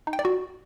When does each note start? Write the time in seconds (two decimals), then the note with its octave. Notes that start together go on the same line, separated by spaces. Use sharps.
0.07 D#4
0.13 G5
0.19 D5
0.25 F#4